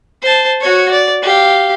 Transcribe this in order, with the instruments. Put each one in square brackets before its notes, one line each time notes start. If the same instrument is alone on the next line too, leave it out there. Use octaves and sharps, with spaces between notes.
[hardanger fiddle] C5 A5
F#4 C#5
D5
G4 F5